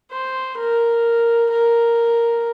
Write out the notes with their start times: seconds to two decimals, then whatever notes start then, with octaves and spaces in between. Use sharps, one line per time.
0.12 C5
0.58 A#4
1.51 A#4